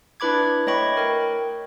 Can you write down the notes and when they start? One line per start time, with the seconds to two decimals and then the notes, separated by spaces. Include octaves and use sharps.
0.20 D4 E4 B4 B5 D6 G#6
0.67 A3 C#5 D#5 G5 B5 C#6
0.97 A#4 G5